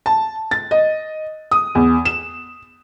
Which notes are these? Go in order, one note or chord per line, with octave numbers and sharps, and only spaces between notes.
A5
A6
D#5
D#6
E2
E7